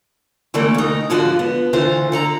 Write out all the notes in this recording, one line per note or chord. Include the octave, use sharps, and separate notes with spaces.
D3 E3 G3 A3 A#3 A4
D2 D#4
G#2 D3 F3 F4 F#4
B3
D2 D3 E3 A3 F4 C5
D3 A4 A#5